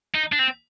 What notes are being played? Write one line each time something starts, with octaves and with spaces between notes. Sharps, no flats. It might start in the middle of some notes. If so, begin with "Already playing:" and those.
D#4
D4
C4